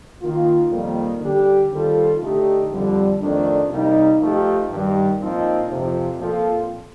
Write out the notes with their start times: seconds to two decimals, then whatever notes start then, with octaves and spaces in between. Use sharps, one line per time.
0.22 D#3 A#3 F4
0.71 F2 D#3 G3 A#3
1.21 D3 G3 D4 G4
1.71 D#3 G3 C4 F4 A4
2.21 D3 A3 D#4 G4
2.70 F2 D3 G3
3.21 F2 D#3 A3 D4
3.70 C3 G3 A#3 D#4
4.20 F3 A3 D#4 G4
4.70 G2 D#3 G3
5.20 A#2 F3 C4 D#4
5.70 F2 C3 F3
6.20 A#2 F3 C4 F4 A4